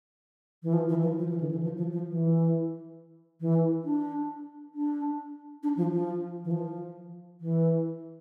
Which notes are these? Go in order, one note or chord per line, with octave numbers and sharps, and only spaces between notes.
E3
F3
E3
F3
F3
E3
D3
E3
F3
F3
F3
E3
E3
D4
D4
D4
F3
F3
E3
F3
E3